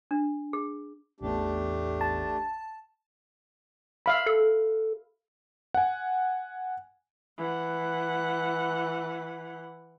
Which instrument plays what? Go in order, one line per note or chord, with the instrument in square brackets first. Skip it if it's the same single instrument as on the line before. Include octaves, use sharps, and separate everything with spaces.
[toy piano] D4
G#4
[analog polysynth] A1 E2 [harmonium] A3 D4 G4
[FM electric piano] A5
[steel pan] E5 F5 B5
[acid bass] A4
[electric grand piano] F#5 G#5
[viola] E3 F#5